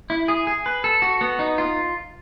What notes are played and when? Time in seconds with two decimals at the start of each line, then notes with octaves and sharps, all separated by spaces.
0.10 E4
0.28 G#4
0.47 G#4
0.66 B4
0.84 A4
1.02 F#4
1.21 B3
1.39 D#4
1.58 F4